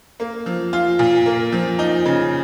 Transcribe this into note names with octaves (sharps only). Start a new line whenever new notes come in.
A#3
F3
F4
A#2
A#3
F3
D#4
C#3